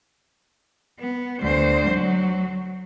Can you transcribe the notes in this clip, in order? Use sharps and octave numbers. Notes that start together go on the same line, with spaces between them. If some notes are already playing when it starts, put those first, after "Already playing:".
B3
D2 C5
F#3